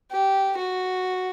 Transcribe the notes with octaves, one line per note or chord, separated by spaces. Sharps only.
G4
F#4